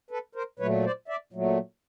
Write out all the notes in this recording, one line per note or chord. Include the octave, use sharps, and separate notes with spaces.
A4 B4
A#4 C5
A#2 F#3 A3 B4 C#5
C5 D5
D5 E5
A#2 F#3 A3